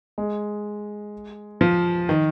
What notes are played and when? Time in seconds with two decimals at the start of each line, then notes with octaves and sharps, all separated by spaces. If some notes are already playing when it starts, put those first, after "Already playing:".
0.18 G#3
1.61 F3
2.09 D#3